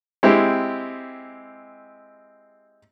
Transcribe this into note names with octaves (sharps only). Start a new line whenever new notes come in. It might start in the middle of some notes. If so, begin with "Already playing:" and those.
G#3 C4 E4 G4